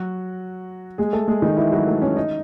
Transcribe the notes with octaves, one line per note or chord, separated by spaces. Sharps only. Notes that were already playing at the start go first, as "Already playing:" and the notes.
Already playing: F#3 F#4
G#3 G#4
A3 A4
G#3 G#4
D#3 D#4
E3 E4
F#3 F#4
A3 A4
C#4 C#5
D#4 D#5